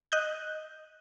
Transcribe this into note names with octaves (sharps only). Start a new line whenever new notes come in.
D#5 F#6 G6